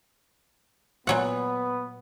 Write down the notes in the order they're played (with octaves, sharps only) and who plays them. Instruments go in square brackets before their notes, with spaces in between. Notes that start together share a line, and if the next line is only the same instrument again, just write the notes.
[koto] A#2 F#3 F#5 [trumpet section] B3